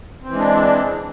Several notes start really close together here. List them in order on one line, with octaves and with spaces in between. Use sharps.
C4 E3 G#3 D4